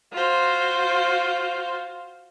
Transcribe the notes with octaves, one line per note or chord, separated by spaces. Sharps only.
F4 F#4 C5